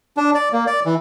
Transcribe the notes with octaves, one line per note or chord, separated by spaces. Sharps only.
D4
D5
A#3
D5
E3